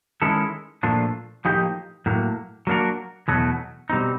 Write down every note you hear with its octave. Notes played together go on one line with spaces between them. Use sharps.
D#3 G#3 C#4 E4 A4
A#2 F3 A3 D4 F4
A2 F3 A#3 D#4 G4
A2 F#3 A#3
F#3 A#3 D4 F#4 A#4
E2 B2 F#3 A3
B2 G3 C4 D#4